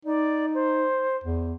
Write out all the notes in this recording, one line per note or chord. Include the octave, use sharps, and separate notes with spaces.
D#4 D5
C5
E2